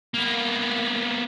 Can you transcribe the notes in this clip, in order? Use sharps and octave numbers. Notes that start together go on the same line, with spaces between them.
A#3 B3